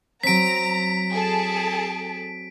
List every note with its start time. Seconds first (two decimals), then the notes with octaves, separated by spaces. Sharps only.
0.23 F#3 C4 A#5 B6 D7
1.12 G#4 A4 A5